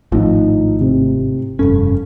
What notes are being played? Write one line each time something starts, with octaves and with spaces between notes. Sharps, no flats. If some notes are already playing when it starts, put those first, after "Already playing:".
G#1 A2 F3 D#4
C3
F1 G2 C#4 A4